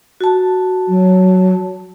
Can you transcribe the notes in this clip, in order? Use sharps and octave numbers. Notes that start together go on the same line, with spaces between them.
F#4 A5
F#3